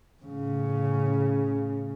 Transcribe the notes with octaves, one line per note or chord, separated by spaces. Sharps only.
A2 C#3